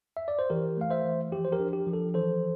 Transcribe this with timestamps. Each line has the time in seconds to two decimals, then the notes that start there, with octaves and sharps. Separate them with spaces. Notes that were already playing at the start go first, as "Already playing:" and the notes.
0.17 E5
0.28 D5
0.39 C5
0.50 E3 G4 A#4
0.77 A3 F5
0.91 C5 E5
1.05 E3
1.32 F3 G4
1.45 C5
1.52 G4 A#4
1.60 D4
1.73 G4
1.87 F3
1.93 A4
2.14 E3 A4 C5